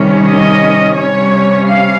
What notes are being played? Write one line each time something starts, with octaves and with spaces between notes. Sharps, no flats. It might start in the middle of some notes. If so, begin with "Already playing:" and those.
Already playing: C3 D#3 G3 C#4
D#5
C3 G3 C#4 C#5
F5